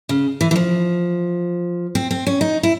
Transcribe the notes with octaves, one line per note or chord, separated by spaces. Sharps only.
C#3
E3
E3
F3
C4
C4
C#4
D#4
E4